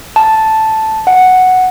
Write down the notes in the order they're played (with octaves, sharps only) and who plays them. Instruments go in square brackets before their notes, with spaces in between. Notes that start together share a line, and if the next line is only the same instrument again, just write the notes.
[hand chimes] A5
F#5